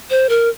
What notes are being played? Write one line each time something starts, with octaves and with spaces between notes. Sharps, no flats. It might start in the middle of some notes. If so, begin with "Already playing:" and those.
C5
A#4